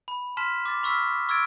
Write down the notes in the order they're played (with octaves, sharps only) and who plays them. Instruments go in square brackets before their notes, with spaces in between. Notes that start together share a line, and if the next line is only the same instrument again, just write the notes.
[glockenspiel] B5
A5 C6 F6 B6 E7
D6 A6
B5 C#6 E6 F6 B6
C#6 E6 F6 G#6 A6 D7